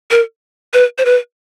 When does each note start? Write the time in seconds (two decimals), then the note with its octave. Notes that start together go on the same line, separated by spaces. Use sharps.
0.11 A#4
0.74 B4
0.98 C5
1.05 B4